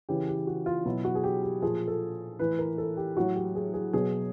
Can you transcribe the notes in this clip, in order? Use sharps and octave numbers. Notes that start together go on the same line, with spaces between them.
C#3 E3 G4
G4
F#4
F4
B2 F#3 E4
F#4
G#4
G4
G4
A#2 F3 G#4
A4
A2 E3 B4
A#4
A4
G4
A2 F#3 F#4
G4
G#4
G#4
B2 F#3 G#4